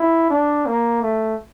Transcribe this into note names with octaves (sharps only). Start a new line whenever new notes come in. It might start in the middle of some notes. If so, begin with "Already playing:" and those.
Already playing: E4
D4
A#3
A3